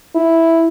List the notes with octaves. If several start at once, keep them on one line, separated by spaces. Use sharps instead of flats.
E4